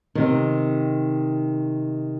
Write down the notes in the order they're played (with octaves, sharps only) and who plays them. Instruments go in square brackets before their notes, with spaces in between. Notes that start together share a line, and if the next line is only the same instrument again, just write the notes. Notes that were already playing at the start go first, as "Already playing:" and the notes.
[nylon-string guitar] C3 D#3